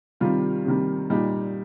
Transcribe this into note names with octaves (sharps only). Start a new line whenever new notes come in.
C3 D#3 G3 F4
C3 D#3 G3
A#2 G3 D#4